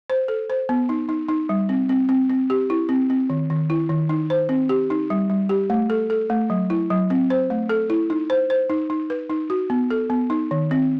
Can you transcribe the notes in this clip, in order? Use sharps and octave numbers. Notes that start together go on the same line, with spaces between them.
C5
A4
C5
B3
D#4
D#4
D#4
G3
C4
C4
C4
C4
G4
E4
C4
C4
D#3
D#3
E4
D#3
D#4
C5
C4
G4
D#4
G3
G3
G4
A3
A4
A4
A3
F#3
E4
F#3
C4
C5
A3
A4
E4
D#4
C5
C5
D#4
D#4
B4
D#4
F#4
B3
A4
B3
D#4
D#3
C4